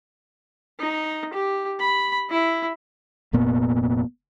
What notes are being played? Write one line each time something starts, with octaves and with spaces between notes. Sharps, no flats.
D#4
G4
B5
E4
F1 A#2 A#3 B3